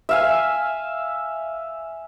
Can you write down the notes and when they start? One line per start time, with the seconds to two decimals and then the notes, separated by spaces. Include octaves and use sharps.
0.09 E5 F5 G#5